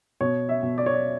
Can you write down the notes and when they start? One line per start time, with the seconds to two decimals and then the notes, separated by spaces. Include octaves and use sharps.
0.21 B2 C#5
0.49 E5
0.63 B2
0.78 D5
0.86 C#5
0.94 D5